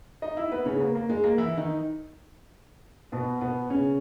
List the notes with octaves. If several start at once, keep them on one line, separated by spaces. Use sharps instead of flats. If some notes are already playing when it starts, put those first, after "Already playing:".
D#4 D#5
E4 E5
B3 B4
C#3 C#4
B3
A#3
A#3
G#3
A#3
E3 E4
D#3 D#4
B2 B3
B2 B3
C#3 C#4